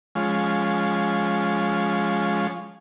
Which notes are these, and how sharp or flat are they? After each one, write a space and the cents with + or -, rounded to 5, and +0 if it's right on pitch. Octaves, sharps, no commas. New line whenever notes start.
F3 +0 G#3 +0 C#4 +0